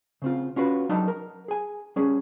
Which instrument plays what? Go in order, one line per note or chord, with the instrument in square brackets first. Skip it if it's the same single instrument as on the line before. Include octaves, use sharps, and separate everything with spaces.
[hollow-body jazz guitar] C#3 C4 F4
C#4 F4 F#4 B4
F#3 D4 D#4 A5
A#4
G#4 G#5
G3 C#4 G#4